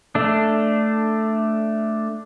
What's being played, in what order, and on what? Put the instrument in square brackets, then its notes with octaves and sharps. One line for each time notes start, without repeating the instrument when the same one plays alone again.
[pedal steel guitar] A3 D4